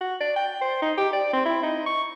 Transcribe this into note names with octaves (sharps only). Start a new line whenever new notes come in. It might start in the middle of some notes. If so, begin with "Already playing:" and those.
F#4
D5
G5
C5
D#4
G4
D5
C4
E4
D#4
C#6